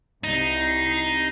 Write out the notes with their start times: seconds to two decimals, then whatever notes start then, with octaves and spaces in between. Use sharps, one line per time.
0.24 C2 D#4 C7